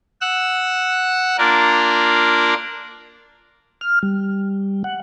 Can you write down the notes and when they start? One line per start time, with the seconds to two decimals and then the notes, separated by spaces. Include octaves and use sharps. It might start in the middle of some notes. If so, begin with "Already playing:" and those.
0.21 F#5 E6 F#6
1.38 A#3 D4 F4 A#4 D5
3.81 F6
4.03 G3
4.84 F#5